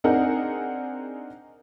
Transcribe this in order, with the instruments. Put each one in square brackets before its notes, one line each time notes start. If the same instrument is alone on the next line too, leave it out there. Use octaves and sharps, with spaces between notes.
[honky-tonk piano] C4 D4 D#4 G#4 A#4 F#5